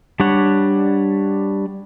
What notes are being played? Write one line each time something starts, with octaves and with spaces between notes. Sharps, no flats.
G3 D4 C#5 F#5